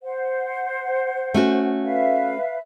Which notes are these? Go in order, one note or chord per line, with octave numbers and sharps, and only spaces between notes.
C5 F#5
A3 C#4 F#4
B4 E5 F5